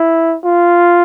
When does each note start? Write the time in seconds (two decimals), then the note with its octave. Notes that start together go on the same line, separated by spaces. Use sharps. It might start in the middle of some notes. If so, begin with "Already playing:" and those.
Already playing: E4
0.44 F4